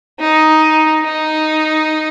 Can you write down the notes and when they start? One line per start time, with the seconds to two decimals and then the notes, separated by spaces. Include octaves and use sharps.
0.20 D#4
1.03 D#4